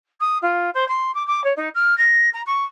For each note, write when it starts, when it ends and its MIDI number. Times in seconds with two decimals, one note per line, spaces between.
0.20 0.38 87
0.42 0.70 65
0.74 0.86 72
0.88 1.13 84
1.14 1.25 86
1.27 1.43 86
1.43 1.53 73
1.56 1.68 63
1.74 1.96 89
1.97 2.29 94
2.33 2.41 82
2.46 2.64 85